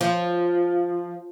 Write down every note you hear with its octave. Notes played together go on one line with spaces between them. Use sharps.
F3